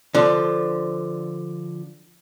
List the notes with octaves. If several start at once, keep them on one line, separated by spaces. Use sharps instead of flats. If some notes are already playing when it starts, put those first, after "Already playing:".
D3 F3